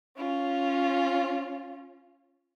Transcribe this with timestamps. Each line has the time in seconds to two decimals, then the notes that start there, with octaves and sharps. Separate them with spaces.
0.17 C#4 F4